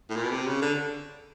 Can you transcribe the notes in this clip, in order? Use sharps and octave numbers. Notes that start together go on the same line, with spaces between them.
A2
A#2
B2
C3
C#3
D3